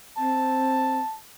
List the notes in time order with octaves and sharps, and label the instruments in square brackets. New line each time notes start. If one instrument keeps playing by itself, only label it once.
[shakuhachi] C4 [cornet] A5